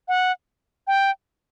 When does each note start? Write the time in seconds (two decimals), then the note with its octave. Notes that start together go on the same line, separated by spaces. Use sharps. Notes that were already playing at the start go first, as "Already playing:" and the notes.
0.08 F#5
0.87 G5